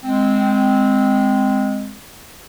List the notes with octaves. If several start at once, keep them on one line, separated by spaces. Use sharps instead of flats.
G#3 C4